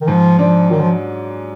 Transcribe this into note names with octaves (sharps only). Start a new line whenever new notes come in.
D#3
G#2 F3
F3 D4
D#3 F#3
F3